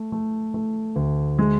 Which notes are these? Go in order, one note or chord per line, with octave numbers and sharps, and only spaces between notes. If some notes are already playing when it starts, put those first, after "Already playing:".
Already playing: A3
A3
A3
D2
G#3